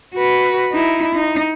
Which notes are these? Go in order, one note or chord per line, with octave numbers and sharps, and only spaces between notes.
F#4 B4
D#4 E4
D#4